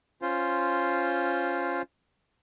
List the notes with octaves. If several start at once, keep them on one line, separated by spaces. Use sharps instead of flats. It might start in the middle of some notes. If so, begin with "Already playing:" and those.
C#4 F4 C5